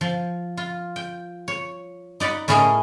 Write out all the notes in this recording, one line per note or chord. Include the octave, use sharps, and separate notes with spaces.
F3
F4
G5
C#5
D#4 D5 F#5 B5
A2 C#4 E4 G#4 A#4 D#5